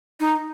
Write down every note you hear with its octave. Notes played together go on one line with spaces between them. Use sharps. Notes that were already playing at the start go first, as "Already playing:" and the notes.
D#4